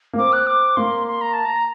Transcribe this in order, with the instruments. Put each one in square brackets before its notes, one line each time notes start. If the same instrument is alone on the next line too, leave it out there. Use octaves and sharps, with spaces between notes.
[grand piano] A#3
[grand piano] C4 [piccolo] D6
[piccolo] F#6
D6
[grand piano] A#3 [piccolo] C6
[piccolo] C6
A#5
A5
A#5